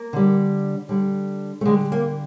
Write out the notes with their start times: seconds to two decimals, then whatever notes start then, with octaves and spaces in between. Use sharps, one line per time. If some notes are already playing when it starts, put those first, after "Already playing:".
Already playing: A#3
0.13 D3 G3
0.89 D3 G3
1.61 A3
1.65 D3 G3 G#3
1.92 A#3